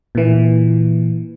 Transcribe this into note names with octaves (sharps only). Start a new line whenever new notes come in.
A#2 E3